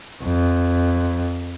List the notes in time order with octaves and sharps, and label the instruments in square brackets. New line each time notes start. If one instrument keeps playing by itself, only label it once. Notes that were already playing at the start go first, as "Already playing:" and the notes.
[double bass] F2